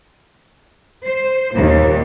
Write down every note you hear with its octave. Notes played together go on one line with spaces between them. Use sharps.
C5
D#2 A#2